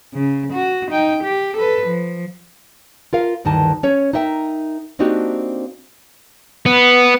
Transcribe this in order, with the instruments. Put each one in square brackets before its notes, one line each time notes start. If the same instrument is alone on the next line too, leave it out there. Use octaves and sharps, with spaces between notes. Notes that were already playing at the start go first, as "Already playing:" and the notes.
[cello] C#3
F#4
D#4 G5
G4
A4 B4
F3
[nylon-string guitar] F4 A#4 F5
D2 G2 D#3 E3 A5
C#4 C#5
D#4 A#4 E5 G5
A#3 C4 D4 D#4 F#4 G4
[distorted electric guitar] B3